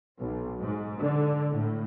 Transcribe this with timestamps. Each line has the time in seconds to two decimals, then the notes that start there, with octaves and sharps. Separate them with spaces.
0.21 B1
0.60 G#2
1.01 D3
1.54 A2